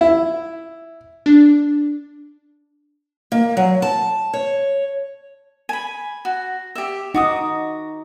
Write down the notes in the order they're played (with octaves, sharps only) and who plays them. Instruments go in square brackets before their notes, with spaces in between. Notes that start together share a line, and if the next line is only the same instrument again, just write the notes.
[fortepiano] E4
[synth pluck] D4
[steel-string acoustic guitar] A#3
F#3
A5
C#5
[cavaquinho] G#5 B5
F#4
G4 E5
[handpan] D#4 [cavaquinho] F#4 D6 D#6